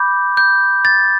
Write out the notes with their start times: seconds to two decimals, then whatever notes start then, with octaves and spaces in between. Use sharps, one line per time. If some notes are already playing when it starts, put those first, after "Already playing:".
Already playing: B5 D6 G6
0.37 G6
0.85 A6